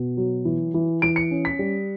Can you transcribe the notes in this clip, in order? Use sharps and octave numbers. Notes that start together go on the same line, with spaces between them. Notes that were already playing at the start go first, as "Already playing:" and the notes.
Already playing: B2
F#3
E3
E3
E3 D7
C#7
C#4
B6
G3